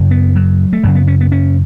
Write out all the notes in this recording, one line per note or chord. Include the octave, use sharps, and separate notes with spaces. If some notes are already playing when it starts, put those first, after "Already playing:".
Already playing: F#2 C#3
B3
F#3
A3
F#2 C#3 F#3
B3
C#4
B3
C#4